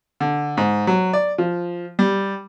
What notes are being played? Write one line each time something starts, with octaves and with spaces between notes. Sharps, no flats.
D3
G#2
F#3
D5
F3
G3